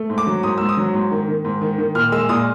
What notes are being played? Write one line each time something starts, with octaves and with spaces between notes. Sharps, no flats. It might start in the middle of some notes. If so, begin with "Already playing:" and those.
Already playing: A3
G#2
D6
F#3
G#2 D#6
G#2 E6
D#6
F#3
G#2
D#3
D#3
G#2
D#3
D#3
A#2 F6
G#3 E6
A#2 D#6